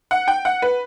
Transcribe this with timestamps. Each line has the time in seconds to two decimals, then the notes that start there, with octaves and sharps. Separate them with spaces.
0.11 F#5
0.28 G5
0.45 F#5
0.62 B4